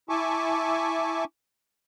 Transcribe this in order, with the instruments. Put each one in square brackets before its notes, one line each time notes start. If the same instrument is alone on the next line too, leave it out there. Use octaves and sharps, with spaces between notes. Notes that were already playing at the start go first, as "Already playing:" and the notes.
[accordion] E4 E5 G#5 A5 C#6 D6